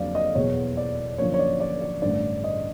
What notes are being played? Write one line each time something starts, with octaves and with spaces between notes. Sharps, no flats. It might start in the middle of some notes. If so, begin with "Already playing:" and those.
Already playing: F2 D3 F#3 A#3 D5 F5
D#5
F#1 E2 B2 C#5
D5
F#2 D3 F3 A#3 C#5
C#5
D5
D5
D5
A1 G2 D3 D5
D#5